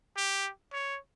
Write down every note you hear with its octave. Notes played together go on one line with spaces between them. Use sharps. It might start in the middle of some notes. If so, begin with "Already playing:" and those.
G4
C#5